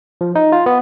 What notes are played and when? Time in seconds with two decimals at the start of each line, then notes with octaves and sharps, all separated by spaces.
0.21 F3
0.35 D#4
0.52 F4
0.66 B3